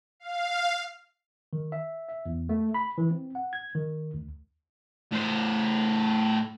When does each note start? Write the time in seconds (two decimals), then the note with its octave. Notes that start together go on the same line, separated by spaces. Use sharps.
0.20 F5
1.53 D#3
1.72 E5
2.09 E5
2.26 E2
2.49 A3
2.74 B5
2.98 E3
3.11 C4
3.35 F#5
3.53 G#6
3.75 D#3
4.14 D2
5.12 A2 C5